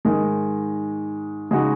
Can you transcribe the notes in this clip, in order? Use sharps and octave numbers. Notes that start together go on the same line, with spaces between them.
G#2 D#3 G#3
C#3 G#3 D#4 F#4